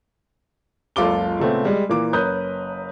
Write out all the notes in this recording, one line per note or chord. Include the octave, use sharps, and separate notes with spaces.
F#1 C#2 F4 A4 D6 G7
A#2 C#3 A3 B3 C4
G3 G#3
A#2 E3 A#3 D6
F#1 C#4 A#4 B4 D#6 G6